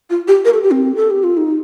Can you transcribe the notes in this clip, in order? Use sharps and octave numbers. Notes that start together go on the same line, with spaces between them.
F4
G4
A#4
A4
G4
C4
A4
G4
F4
D#4